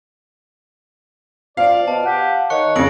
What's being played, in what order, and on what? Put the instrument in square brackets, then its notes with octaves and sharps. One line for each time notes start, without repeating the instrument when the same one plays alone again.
[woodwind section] F3 [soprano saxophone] D5 [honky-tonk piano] F5
[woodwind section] B2 [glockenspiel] A5
[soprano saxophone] G4 [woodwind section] F#5
[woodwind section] D#3 [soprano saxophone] C#5 [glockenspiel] C#6 F#6 C#7
[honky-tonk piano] F2 C#3 [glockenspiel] A#6 D7 F#7